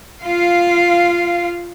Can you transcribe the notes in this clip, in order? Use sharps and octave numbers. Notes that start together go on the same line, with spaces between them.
F4 F5